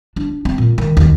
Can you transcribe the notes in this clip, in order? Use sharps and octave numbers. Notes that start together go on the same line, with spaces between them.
D4
C4
A#2
D#3
D#2